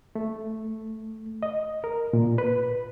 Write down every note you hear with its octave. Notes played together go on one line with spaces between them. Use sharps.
A3
D#5
A#4
A#2
B4